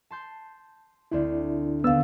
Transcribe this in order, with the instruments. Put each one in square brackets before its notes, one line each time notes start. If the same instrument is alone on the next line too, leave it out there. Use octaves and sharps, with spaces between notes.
[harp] A5 C6 G6
[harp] D2 C4 D4 [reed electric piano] E4 D5
[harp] D#2 A6 [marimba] D3 F5 [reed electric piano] B3 E6